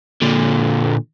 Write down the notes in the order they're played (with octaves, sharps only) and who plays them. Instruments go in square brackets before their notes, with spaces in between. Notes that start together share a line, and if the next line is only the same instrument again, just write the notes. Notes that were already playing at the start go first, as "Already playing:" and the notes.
[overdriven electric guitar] A#2 D3